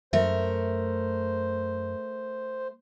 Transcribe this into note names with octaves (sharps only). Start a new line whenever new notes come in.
F#2 A3 A#4 C5 E5